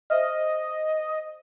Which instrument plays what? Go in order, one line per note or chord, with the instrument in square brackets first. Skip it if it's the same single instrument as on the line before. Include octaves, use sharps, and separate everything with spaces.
[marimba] C5 E5 F6 [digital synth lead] D#5